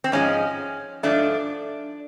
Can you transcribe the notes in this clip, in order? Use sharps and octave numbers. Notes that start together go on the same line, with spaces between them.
C4
G#2 F3 G#3 C#4
G#2 F3 A3 D4